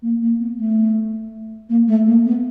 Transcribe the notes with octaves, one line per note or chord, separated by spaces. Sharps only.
A#3
A#3
B3
A3
A#3
A3
A#3
B3